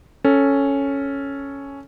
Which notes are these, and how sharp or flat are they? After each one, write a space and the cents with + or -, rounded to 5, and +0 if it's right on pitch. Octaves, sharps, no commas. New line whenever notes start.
C#4 +0 A4 +0